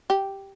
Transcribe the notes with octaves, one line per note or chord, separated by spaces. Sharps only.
G4